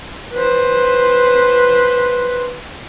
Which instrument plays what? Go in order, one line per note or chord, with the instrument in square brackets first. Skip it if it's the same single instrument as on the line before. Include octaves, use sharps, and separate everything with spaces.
[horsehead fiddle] B4 C5